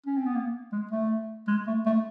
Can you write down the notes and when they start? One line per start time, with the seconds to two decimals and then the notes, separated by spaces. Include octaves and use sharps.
0.06 C#4
0.17 C4
0.26 B3
0.35 A#3
0.72 G#3
0.91 A3
1.48 G#3
1.67 A3
1.86 A3